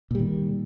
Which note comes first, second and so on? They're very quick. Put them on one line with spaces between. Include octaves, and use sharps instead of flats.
A#2 G3 D#3